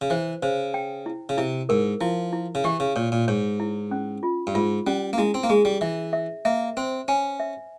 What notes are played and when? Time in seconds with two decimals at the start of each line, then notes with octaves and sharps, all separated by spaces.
0.01 C#3
0.10 E3 C5
0.42 C#3 C5
0.74 G5
1.06 E4
1.29 C#3
1.38 C3 E4
1.69 G#2 A#4
2.01 F3 E4
2.33 E4
2.55 C#3
2.64 E3 G4
2.80 C#3
2.96 A#2 C#5
3.12 A#2
3.28 G#2 C#5
3.60 E4
3.91 C#4
4.23 F4
4.47 G2
4.55 G#2 F4
4.87 G3 C#4
5.13 A#3
5.18 G#3 E4
5.34 C4
5.44 A#3
5.50 G#3 G#4
5.65 G3
5.81 E3 E5
6.13 E5
6.45 A#3 E5
6.77 C4 C5
7.08 C#4 G#5
7.40 E5